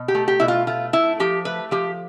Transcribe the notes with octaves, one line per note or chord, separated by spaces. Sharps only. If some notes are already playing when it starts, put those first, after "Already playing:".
Already playing: B2
G4
A3
G4
B2 E4
F4
A3 F4
A3 E4
F3 G4
A3 B4
F3 G4